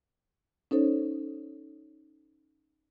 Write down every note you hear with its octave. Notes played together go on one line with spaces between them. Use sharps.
C#4 D#4 A4 C5 C#5